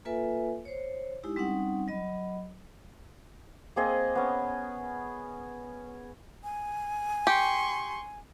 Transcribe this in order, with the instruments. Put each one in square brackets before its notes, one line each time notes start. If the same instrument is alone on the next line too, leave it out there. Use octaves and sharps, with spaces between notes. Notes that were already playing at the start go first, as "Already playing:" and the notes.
[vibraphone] A#3 F4 A4 B4 E5 G#5
C5 C#5
G#3 D#4 E4 G4
G3 C4 C#4 D#4 F#5
F#3 D#5 B5
[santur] A#3 C4 G#4 D#5
B3 C#4
[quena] G#5
[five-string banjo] G4 [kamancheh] C6 C#6